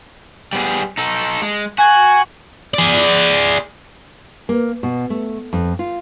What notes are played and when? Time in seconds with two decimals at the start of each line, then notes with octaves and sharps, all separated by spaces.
0.53 G3 B3 G#4
0.98 D#4 A4
1.42 G#3
1.78 F#4 G#5
2.74 G#4 D5
4.49 A#3
4.83 B2
5.10 A3
5.53 F2
5.79 F4